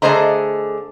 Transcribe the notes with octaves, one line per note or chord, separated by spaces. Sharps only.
D3 A3 G#4 C5 D#5 A#5